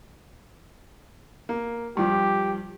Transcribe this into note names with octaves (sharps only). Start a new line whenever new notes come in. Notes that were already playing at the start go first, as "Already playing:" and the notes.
A#3
G2 F3 G4